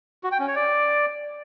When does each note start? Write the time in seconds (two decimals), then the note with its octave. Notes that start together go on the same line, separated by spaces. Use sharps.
0.24 F#4
0.32 G5
0.40 C#4
0.48 C#5
0.56 D5